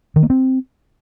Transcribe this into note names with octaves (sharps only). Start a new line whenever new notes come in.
D#3
A#3
C4